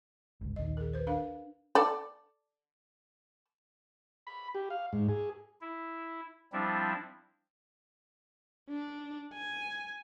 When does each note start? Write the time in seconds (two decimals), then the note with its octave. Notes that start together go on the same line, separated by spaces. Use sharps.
0.41 G1 C#2
0.56 A#1 D#2 D#3 D#5
0.77 G#4 A#4
0.93 B4 C5
1.07 D4 A#4 F5
1.75 A4 D5
4.27 B5
4.55 G4
4.70 F5
4.93 G#2
5.09 G#4
5.61 E4
6.53 F3 G3 C4 D4 E4
8.69 D4
9.33 G#5